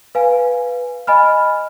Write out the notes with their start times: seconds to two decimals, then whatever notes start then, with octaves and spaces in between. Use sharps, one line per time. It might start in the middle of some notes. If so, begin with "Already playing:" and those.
0.15 B4 F5 G#5
1.07 D#5 G#5 B5 F6